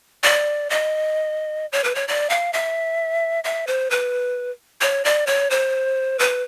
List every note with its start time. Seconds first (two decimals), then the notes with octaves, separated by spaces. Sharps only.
0.24 D5
0.70 D#5
1.72 C#5
1.84 B4
1.95 C#5
2.08 D5
2.30 F5
2.53 E5
3.44 E5
3.67 C5
3.90 B4
4.81 C#5
5.05 D5
5.27 C#5
5.50 C5
6.19 B4